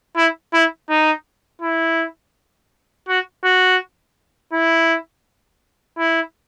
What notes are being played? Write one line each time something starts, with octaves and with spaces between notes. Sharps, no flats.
E4
E4
D#4
E4
F#4
F#4
E4
E4